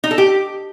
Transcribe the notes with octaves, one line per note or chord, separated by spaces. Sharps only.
D#4
A4
G4